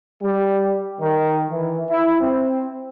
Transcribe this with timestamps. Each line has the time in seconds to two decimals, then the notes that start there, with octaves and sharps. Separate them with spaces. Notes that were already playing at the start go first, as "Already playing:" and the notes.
0.22 G3
1.01 D#3
1.51 E3
1.91 E4
2.21 C4